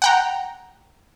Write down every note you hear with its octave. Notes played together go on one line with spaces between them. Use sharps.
F#5 G5 A#5